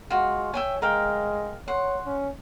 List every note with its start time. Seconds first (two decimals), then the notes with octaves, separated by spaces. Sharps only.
0.10 G#3 F4 F#4
0.54 C#5 E5 G5 G#5
0.82 G#3 A#4 F5 G5
1.68 C#5 F#5 C6
2.06 C#4